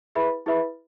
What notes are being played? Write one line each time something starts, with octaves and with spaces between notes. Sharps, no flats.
E4 G#4 B4 E5 B5
E4 G#4 B4 E5 B5